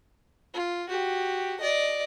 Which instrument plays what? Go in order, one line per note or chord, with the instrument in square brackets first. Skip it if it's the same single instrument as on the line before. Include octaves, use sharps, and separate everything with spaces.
[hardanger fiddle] F4
F#4 G4
D5 D#5